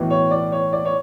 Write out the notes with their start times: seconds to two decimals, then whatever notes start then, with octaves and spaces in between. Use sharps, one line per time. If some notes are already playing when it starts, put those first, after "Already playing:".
Already playing: B1 A2 E3
0.10 C#5
0.31 D5
0.52 C#5
0.73 D5
0.85 C#5